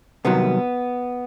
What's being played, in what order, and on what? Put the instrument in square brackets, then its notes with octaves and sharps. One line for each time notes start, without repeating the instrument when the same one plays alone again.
[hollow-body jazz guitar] C2 C3 D#3 F#3 B3